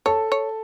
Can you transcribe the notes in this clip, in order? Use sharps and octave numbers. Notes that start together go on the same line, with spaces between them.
A4 C#5 A5
C#5